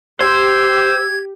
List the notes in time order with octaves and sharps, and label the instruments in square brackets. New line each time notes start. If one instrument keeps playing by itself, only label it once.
[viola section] G4 [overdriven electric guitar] C5 [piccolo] E6 [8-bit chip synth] G#6